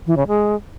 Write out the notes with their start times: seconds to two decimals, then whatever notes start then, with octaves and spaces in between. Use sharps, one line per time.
0.06 E3
0.17 C#3
0.27 G#3